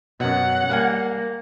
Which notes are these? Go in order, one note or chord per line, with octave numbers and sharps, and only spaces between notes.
F#2 B2 F#3 F#5
G3 A#3 F5 G#5